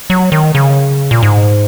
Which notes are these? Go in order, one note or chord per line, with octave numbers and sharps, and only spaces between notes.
F#3
D#3
C#3
A#2
G#2